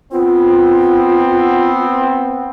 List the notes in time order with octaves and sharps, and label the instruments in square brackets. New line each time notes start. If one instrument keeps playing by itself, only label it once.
[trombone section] B3 C4 [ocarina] F4